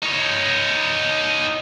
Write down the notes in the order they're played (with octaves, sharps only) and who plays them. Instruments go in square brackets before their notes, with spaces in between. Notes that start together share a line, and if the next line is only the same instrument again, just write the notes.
[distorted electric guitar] D#4 C#5